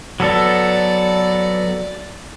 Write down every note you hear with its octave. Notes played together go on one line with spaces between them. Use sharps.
F#3 B3 A4 D5